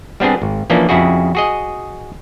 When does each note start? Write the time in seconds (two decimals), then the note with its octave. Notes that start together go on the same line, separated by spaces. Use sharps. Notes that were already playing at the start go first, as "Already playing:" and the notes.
0.20 G3 B3 C4 D4 G#4
0.42 G#1
0.70 E3 F3 A#3 C#4 D4
0.89 F2 C#3 E4 F#4 G#4
1.35 F#4 G#4 D#5